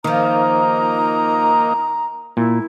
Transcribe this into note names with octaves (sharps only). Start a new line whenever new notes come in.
D#3 F3 A#3 D#4 A#5
A#2 E4